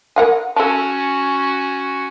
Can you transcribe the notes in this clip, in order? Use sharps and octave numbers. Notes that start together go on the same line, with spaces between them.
A#4 F#5 G#5
C#4 F#4 A4 A5